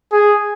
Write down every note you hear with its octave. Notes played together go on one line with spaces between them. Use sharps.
G#4